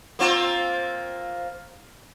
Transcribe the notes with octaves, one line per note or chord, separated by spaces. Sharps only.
A#3 C4 F4